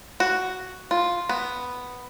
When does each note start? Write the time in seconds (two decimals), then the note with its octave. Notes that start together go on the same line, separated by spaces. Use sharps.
0.20 F#4
0.91 F4
1.29 B3